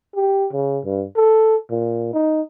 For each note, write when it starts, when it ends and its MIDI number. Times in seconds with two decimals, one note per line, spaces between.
0.16 0.47 67
0.52 0.80 49
0.85 1.05 43
1.16 1.56 69
1.70 2.12 46
2.13 2.41 63